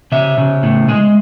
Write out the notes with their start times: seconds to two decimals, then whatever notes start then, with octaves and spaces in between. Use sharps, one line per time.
0.12 C#3 E5
0.38 C#3
0.63 A2
0.88 G#3